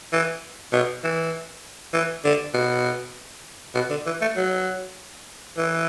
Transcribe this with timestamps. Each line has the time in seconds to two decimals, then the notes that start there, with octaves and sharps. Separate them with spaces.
0.13 E3
0.73 B2
1.04 E3
1.94 E3
2.25 D3
2.54 B2
3.75 B2
3.91 D3
4.06 E3
4.21 A3
4.36 F#3
5.57 E3